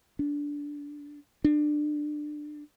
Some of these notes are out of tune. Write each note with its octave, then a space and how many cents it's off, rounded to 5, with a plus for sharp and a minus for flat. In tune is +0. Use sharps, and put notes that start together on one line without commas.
D4 -15
D4 +20